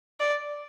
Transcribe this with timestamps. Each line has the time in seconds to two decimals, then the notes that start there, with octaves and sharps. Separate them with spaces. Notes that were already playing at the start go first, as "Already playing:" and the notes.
0.20 D5